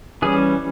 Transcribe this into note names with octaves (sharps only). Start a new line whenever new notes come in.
E3 G3 C#4 G#4